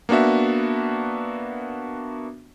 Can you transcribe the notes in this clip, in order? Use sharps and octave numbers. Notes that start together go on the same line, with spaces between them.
A#3 B3 D4 F#4 E5